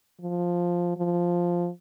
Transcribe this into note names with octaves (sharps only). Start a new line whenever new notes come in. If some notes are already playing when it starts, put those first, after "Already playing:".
F3
F3